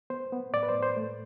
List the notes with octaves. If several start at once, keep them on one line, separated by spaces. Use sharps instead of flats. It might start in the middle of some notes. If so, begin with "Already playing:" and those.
B3 C5
B3
A2 D5
B4
C5
A2
C5
A3